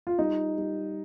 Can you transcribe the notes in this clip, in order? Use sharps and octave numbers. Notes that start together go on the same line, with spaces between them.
F4
G3 D#4
G3